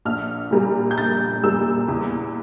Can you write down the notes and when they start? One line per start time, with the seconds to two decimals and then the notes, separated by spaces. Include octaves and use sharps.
0.05 A#1 F6
0.51 A#2 G3 A#3
0.91 G6
0.97 A#1 A6
1.43 A#2 G3 A#3 E6
1.88 E2